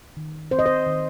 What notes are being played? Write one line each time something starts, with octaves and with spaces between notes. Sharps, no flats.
D#3
C4 C5
D#5
C5
D#3